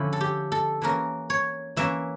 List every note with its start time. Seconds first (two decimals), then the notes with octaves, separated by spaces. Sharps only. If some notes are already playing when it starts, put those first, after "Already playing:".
Already playing: D3 F3 C#4 E4
0.13 A4
0.21 G4
0.52 A4
0.82 E3 A#3 C#4 A#4
1.30 C#5
1.76 E3 A#3 C#4 E5